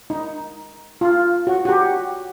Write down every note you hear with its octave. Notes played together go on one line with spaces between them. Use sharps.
D#4
F4
F#4
F#4
G4